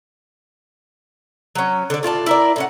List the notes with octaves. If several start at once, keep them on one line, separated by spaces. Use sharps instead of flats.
F#3 C#4
D3 D5
A2 F4 D5 A5
E4 A#4 D5
A2 C#4 F#5